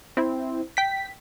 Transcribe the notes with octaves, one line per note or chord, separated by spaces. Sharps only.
C4 E4
G5 B6